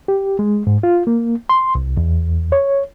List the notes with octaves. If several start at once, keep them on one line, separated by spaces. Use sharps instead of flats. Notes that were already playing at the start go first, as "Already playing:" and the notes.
G4
G#3
G#2
F4
A#3
C6
C2
E2
C#5